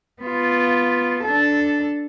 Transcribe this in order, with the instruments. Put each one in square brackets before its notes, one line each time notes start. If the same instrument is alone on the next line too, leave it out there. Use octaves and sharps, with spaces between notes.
[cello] B3 F4
D4 A4